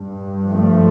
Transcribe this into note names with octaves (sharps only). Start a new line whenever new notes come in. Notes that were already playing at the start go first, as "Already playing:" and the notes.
Already playing: G2
F3 A3